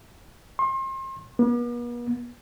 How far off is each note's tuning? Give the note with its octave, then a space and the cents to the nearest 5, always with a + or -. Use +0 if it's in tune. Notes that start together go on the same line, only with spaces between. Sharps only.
C6 +35
B3 -45